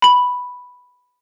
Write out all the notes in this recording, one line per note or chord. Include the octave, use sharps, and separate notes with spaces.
B5 F#7